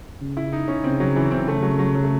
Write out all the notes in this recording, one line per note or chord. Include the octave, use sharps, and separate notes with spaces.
C#3
E4
D#4
C#4
C#3 C4
F#3
E3
C4
C#3 A3
F#3
F#3
F#3
A3